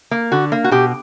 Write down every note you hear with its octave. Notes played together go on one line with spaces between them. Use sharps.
A#3
D3 F#4
A#3
F#4
B2 G4